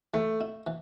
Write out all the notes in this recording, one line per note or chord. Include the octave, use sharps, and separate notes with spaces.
E3 A3
E4
E3